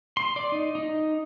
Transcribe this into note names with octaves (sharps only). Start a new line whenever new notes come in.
C6
D5
D#4
D#4